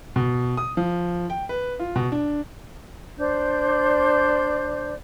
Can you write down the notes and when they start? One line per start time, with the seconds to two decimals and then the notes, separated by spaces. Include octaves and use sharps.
0.16 B2
0.57 D#6
0.77 F3
1.30 G5
1.49 B4
1.79 F4
1.96 B2
2.12 D4
3.18 D4 C5 D5 G6